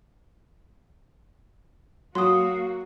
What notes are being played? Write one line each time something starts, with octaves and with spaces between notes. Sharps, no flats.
F#3 A#3 F#4 F5 C6 D#6